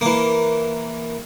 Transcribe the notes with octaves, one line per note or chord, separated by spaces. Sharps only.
E3 A#3